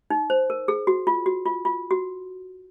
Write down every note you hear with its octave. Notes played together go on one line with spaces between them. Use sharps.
D#4
C5
A#4
G#4
F#4
F4
F#4
F4
F4
F#4